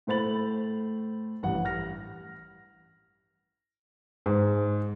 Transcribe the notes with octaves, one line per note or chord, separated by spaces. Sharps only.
A2 A3 C5 B5 A6 F#7
A1 G2 F#5
F6 A#6
G#2